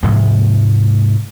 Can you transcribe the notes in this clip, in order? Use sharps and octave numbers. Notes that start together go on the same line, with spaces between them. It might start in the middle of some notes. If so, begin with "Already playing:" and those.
G#2 C3 F3 G#3